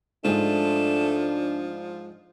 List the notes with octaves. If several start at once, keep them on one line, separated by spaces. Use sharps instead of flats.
G#2 F3 G#3 A3 D4